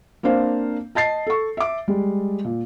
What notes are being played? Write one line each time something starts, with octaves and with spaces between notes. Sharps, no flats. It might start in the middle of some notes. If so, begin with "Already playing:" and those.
A#3 C4 D4 C5 F5
D#5 A5 A6 C7
A4 C#6
E5 D6
G3 G#3
A#2